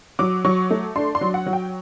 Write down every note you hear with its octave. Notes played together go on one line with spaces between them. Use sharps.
F#3 D6
F#3 C#6
A3
D4 C6
C6
F#3
F#5
F#3
G5